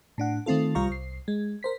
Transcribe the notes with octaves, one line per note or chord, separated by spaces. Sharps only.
A2 D4 F#5
D#3 A3 C4 F4 A4
C2 G3 F4 F5 A#5 C#6
C2 C7
G#3
A#4 C5 B6